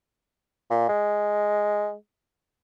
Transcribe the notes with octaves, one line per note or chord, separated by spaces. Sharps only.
A#2
G#3